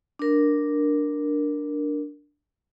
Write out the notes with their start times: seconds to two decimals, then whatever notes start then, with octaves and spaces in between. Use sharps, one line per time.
0.19 D4 A#4